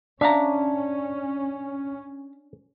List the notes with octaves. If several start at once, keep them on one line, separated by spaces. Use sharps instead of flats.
C#4 D4 E5 F5 A#5